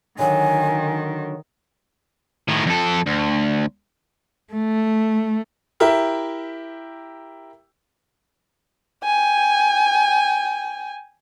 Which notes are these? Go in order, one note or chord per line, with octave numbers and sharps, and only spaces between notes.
D3 D#3 F#3 G#5
A2 D#3
F2 A4
D2
A3
E4 G4 A#4 E5
G5 G#5